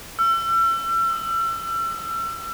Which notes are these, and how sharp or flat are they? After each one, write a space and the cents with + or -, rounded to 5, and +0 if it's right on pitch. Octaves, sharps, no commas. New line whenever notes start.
E6 +40
E6 -35